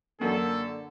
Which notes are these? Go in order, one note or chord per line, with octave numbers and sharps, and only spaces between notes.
F#2 D3 A#3 A4